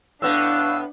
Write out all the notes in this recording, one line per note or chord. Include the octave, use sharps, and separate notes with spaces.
A2 B3 D4 F5 E6 F#6